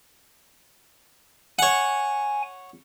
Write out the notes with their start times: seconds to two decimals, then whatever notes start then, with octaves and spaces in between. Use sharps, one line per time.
1.59 C#5 F#5 G#5